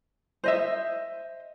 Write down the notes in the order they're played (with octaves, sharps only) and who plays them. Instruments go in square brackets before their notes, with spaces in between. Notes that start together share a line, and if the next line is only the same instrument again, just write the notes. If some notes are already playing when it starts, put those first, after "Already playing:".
[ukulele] C5 D#5 E5